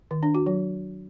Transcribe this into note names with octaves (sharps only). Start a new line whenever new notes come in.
D#3
D4
F#4
F#3